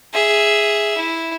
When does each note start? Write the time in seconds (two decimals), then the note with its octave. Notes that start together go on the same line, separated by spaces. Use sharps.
0.14 G#4 E5
0.97 E4